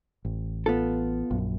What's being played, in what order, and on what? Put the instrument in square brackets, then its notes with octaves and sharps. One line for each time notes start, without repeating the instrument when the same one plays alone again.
[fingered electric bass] A1
[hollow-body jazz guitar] B3 F4 A4
[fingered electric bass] A#1 F#2